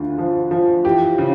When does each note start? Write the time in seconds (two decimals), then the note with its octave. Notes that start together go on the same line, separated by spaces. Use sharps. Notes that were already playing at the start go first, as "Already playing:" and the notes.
Already playing: D2 D3 F4
0.18 F3
0.51 F3
0.84 E3 G4
1.18 C#3